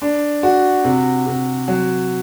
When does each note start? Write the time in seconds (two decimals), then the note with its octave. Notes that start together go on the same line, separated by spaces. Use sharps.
0.02 D4
0.43 F#4
0.84 C3
1.27 C3
1.68 F#3